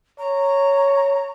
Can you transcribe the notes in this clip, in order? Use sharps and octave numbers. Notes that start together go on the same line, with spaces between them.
C#5 A#5